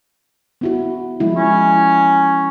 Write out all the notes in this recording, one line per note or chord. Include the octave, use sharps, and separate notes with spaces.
B3 E4 F#4
F3 G#3 E4
C#4